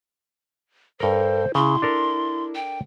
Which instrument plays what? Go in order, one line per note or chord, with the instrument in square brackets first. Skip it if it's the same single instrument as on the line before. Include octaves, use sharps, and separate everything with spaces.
[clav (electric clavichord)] G2 A#4 [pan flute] A4 [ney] C5
[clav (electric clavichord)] C#3 [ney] E4 [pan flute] C6
[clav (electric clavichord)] D4 A4 A#4
[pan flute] G5